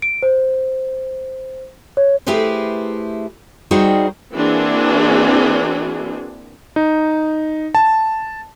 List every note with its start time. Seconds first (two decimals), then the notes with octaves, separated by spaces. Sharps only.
0.02 D7
0.23 C5
1.97 C#5
2.27 A3 E4 G4 G#4 B4 C5
3.71 G3 D#4 F#4 G#4 C5 G5
4.35 E3 A#3 C4 D4 F#4 G#4
6.76 D#4
7.75 A5